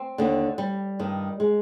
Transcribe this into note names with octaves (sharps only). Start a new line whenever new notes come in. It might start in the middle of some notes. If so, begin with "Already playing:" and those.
Already playing: C4
D#2 D3
G3
G2 D#3
G#3